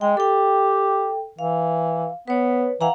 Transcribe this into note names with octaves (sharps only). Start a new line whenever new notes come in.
G#3 G5
G4 A4 G5
E3 F5
B3 B4 C#5
E3 F5 F#5 A#5